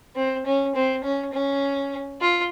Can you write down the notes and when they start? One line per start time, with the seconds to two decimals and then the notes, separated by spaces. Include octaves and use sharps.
0.15 C4
0.45 C#4
0.75 C4
1.03 C#4
1.33 C#4
2.21 F4